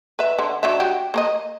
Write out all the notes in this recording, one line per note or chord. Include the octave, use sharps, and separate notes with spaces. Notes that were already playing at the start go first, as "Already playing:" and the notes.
B4 E5
D3
F#3 D4 E5
F#4 G4
A#3 A#4 D#5